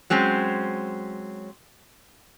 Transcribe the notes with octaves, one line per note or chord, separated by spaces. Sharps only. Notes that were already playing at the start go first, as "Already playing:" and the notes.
F#3 G#3 C4 C#4